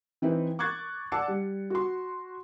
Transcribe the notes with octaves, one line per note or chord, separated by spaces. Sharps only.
E3 C4 D#4 E4 B4
C#6 D6 F#6 G#6 A6
D5 F#5 A5 D6 E6 C#7
G3
F#4 C6